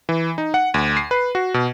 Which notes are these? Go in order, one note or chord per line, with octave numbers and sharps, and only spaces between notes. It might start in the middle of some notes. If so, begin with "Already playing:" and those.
E3
D#4
F#5
D2
C7
B4
F#4
B2